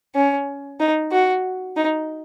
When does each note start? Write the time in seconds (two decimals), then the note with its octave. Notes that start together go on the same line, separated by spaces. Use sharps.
0.15 C#4
0.80 D#4
1.12 F#4
1.76 D#4